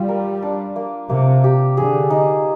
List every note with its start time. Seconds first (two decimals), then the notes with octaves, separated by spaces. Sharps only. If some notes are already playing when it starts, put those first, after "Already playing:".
Already playing: G3 F4
0.09 A#4
0.42 D4
0.76 A#3
1.09 C3 A#3
1.44 G4
1.76 D3 G#4
2.10 D#4